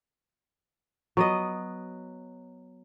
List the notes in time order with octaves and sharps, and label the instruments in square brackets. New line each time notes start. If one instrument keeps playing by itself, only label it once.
[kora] F#3 B3 D#5